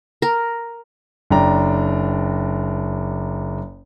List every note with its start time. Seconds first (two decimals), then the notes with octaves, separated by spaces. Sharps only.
0.22 A#4
1.30 F#1 D4 G5 A#5